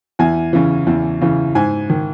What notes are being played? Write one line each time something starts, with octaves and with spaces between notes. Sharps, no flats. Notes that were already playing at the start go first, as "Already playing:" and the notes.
E2 G#5
C#3 E3
E2
C#3 E3
G#2 G#5
D#3